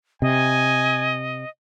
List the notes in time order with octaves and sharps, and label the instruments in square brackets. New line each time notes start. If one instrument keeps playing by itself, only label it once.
[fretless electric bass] C3 [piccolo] D#5 [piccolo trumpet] G#5